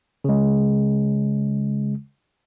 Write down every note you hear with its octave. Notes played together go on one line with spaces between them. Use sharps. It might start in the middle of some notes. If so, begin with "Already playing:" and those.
C#3 G#3